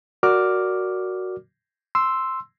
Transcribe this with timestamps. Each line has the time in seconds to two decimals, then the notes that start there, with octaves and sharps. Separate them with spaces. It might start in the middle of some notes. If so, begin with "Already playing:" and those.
0.23 F#4 A#4 D5 D6 F6
1.95 C6 E6